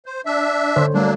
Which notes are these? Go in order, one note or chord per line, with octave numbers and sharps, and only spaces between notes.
C5
D4 E5
D3 C5 C#5
F#3 G3 A3 A#3 D4